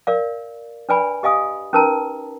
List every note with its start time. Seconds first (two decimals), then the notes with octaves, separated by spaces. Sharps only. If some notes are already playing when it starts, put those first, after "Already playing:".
0.07 A#4 D5 F5
0.89 D4 B4 D5 G#5 B5
1.23 G4 D#5 F5 G#5 D#6
1.73 C#4 D#4 A#4 B4 A5 A#5